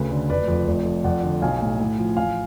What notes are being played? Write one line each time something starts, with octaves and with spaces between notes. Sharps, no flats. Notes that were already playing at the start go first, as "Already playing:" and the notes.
Already playing: D2 C#3 B4
D3
F1 B4 D5
F2
F1
F2
F2 D5 F#5
D3
B1 F5 G#5
A2
A2
F3
A1 F5 G#5